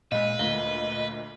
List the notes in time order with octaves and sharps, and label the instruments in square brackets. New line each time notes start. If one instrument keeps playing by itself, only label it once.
[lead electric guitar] A#2 G#3 [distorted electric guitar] B4 [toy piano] D#5 B5 E6 [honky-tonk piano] F5
[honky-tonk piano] D2 A#2 [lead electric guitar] D#5 [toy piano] F5